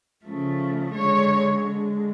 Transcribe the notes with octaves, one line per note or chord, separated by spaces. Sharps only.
C#3 F3 A3
D3 G#3 C#5
D3 G#3